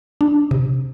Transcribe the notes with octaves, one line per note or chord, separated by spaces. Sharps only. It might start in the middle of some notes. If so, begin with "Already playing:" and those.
D4
C3